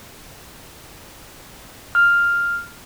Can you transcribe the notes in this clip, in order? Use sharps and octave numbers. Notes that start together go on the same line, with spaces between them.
F6